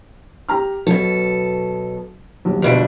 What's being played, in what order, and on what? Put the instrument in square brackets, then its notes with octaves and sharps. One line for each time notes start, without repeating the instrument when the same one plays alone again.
[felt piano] G4 A#5 F6
[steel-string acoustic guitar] B2 A4 [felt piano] F#3
[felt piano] D#1 B1
[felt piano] G1 E5 D7 [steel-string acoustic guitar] F2 B2 D4